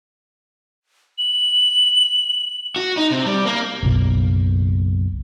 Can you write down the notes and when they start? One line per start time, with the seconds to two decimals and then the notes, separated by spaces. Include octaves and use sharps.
1.18 F#7
2.76 F#4
2.97 D#4
3.11 C3
3.26 G3
3.46 A#3
3.83 F#1 B1